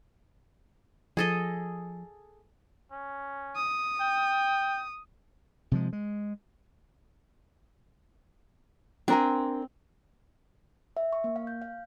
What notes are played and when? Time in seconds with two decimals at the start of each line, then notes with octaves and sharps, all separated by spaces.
1.17 F3 G#4 A4 D#5
2.92 C#4
3.56 D#6
4.00 G5
5.71 C3 F3 G#3
5.93 G#3
9.08 C4 D4 A#4 G#5
10.97 E5
11.13 C#6
11.24 A#3
11.36 F5
11.47 G6
11.62 F5